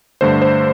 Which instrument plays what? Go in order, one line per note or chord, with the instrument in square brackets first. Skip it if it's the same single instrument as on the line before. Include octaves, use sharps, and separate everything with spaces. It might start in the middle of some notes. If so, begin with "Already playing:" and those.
[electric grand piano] G2 D3 A3 C5
C5